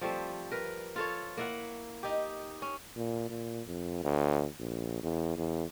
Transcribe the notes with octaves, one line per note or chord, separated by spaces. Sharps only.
F3 G3 A3 C4
A#4 B4
F4 A4 C#5
A#3 E4 F#5
D#4 G4
C#4
A#2
A#2
F2
D2
A#1
E2
E2